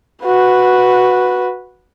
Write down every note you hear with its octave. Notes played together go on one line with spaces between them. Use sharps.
F#4 B4